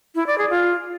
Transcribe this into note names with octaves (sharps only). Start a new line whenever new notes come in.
E4
D5
G#4
F4